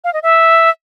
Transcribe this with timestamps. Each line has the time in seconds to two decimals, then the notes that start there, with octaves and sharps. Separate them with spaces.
0.04 F5
0.13 D#5
0.23 E5